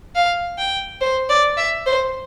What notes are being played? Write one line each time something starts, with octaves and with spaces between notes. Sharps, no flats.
F5
G5
C5
D5
E5
C5